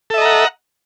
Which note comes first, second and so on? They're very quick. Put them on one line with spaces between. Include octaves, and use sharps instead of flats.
A4 E5 D#5 A#5 F#5